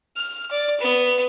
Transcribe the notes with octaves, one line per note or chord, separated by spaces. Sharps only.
F6
D5
B3